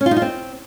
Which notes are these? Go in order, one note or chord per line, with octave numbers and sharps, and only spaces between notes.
C#4
F4
D#4
F4
C4